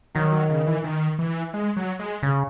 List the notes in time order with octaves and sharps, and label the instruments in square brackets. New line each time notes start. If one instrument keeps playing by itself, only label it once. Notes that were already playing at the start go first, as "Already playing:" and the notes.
[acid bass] D#3 [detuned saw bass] F#3
[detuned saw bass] F#3
C#3
E3
D#3
E3
G#3
F#3
G#3
[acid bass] C#3